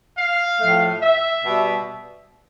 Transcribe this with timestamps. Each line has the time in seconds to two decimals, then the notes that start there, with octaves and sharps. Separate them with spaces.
0.18 F5
0.60 A2 F3 A3
1.01 E5
1.42 B2 G3